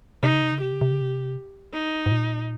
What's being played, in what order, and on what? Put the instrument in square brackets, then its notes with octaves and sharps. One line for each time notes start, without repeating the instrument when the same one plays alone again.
[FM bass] C3 [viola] D#4
[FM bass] C#3
C3
C#3
[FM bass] C3 [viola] G4
[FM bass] C#3
C3
C#3
C3
[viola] D#4
[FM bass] G#2
A#2